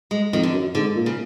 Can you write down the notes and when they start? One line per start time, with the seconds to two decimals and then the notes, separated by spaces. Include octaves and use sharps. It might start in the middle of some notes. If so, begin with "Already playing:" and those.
0.11 G#3
0.33 F2 D#3
0.43 D3
0.53 F#2
0.75 G#2 D3
0.96 A#2
1.06 C#3